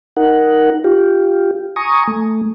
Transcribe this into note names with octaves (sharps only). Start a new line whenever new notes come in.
D#4 A#4 F#5
F4 G4
G#5 A#5 C#6 D#6
A3